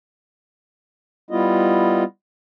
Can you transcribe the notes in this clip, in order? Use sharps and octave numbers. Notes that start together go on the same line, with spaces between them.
G3 B3 E4 F4 D#5